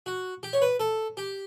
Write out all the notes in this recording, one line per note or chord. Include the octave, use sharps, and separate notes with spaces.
F#4
G4
C#5
B4
A4
G4